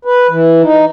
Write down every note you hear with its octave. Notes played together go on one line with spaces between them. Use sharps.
B4
E3
D#4